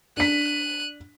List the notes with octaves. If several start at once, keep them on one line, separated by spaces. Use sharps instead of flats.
D4 F#6 B6 D#7